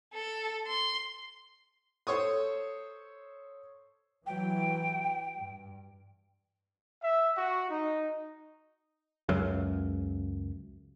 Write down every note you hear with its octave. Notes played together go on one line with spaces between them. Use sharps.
A4
C6
A4 C5 C#5 C#6 D#6
E3 F#3 G5
G2
E5
F#4
D#4
C#2 F#2 C#3